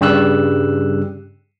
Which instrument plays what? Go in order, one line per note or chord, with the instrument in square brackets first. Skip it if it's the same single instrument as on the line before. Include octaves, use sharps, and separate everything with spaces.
[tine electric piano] G2 C#3 G3 G4 E6 F#6